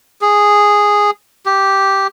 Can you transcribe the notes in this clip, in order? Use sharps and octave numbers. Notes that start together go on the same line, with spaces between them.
G#4
G4